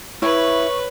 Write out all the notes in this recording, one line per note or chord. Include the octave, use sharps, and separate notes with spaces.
E4 B4 C#5 C#6